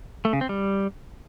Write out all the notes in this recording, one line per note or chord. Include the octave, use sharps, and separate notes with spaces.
A3
C#3
C4
G3